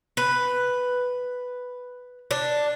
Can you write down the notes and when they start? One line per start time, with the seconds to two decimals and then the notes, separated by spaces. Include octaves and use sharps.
0.17 B4
2.31 D4